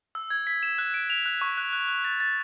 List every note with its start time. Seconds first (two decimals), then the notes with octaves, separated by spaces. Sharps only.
0.15 E6
0.30 G#6
0.47 B6
0.63 E7
0.78 F#6
0.94 D7
1.10 F7
1.26 F#6
1.41 C#6
1.58 F#6
1.73 F#6
1.88 F#6
2.05 A6
2.20 A6